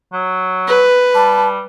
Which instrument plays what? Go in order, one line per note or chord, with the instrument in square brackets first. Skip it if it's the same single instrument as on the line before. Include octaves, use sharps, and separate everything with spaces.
[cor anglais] F#3
[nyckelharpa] B4
[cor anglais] G3 [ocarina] A5